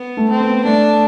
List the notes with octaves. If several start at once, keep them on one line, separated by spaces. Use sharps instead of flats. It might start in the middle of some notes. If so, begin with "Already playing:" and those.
Already playing: B3
A3
C4
B3
A3 D4